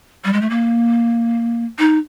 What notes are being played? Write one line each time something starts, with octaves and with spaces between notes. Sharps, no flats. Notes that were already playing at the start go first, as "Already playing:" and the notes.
G3
G#3
A3
A#3
D#4